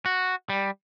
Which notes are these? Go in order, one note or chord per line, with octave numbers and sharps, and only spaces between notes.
F#4
G3